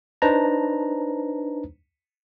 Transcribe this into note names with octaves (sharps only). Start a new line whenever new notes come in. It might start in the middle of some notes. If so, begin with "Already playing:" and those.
D4 D#4 B4 C5 A5 A#5